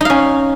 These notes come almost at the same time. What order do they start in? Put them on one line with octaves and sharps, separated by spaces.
D#4 F5 C#4